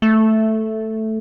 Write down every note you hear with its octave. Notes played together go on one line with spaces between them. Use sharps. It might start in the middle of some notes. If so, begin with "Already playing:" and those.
A3